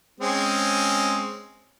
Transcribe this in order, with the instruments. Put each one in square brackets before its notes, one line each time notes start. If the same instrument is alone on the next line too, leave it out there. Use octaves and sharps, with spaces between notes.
[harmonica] G#3 C4 C#4